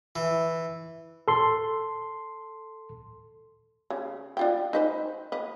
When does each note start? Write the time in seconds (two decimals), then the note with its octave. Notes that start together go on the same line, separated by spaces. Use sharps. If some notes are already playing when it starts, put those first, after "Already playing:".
0.16 E3
1.28 A4 C6
3.90 C#3
4.37 D4 F4 G5
4.73 D#4 B4 C5
5.32 B4 D#5